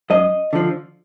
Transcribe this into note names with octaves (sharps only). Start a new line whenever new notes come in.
F#2 D#5
D3 F3